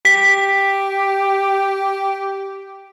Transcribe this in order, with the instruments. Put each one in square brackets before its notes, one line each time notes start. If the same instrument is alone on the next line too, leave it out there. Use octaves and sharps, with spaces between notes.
[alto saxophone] G4 [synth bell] B6